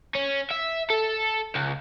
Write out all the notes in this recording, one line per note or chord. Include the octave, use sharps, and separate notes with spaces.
C#4
E5
A4
C#2